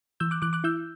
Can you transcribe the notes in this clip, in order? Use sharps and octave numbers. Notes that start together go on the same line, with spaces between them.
E3 E6 G6
D6 F#6
E3 D6 F#6
D6 F#6
E4 E6 G6